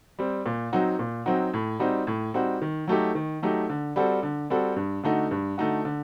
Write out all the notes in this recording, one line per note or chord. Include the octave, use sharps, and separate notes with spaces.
G3 C4
A#2
F#3 C4 D#4 F#4
A#2
F#3 C4 D#4 F#4
A2
G3 C4 D#4 F#4
A2
G3 C4 D#4 F#4
D#3
F#3 A3 D#4 G4
D#3
F#3 A3 D#4 G4
D3
G3 C4 F#4 A4
D3
G3 C4 F#4 A4
G2
D3 A3 D#4 F#4
G2
D3 A3 D#4 F#4
D3